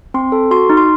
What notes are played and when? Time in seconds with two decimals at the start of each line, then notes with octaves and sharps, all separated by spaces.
0.14 C4 C6
0.32 A4
0.51 F#4 C6
0.70 D#4
0.77 C6